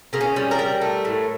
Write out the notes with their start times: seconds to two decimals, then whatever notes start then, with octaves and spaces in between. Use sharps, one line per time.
0.13 C#3 A#3
0.21 C#4
0.36 G3
0.51 A#4
0.59 G3
0.81 A3
1.05 A2